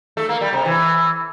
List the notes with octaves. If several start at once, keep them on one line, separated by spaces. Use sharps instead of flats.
A3
A#3
G3
C3
E3